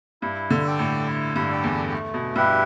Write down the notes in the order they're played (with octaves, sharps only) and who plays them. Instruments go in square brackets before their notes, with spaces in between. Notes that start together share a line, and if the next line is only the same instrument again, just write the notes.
[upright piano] G2 [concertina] E4
[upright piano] D3
[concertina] A4 D5 G5
[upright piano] A2
[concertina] E4
[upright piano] G2
[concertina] A4 D5 G5
[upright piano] E2
[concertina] A3
[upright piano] B2
[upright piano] G2 [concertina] E4 G4 B4 E5